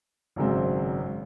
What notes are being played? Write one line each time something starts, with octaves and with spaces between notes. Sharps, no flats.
G#1 F#2 C#3 G#3 C4